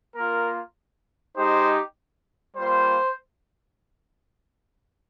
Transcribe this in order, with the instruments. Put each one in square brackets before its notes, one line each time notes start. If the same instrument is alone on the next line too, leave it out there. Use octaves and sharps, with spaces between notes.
[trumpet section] A#3 F4 A#4
G#3 D#4 G4 C5
G3 A#3 F4 C5